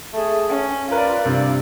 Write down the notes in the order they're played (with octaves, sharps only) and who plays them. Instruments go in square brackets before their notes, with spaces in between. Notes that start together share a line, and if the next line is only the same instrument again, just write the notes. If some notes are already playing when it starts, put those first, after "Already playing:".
[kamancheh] A3 G#4
C#4
[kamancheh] F4 D5 [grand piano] A#4 B4
[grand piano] G2 C3